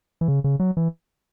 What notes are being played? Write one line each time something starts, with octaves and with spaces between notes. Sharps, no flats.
E3
C#3
C#3
F#3
E3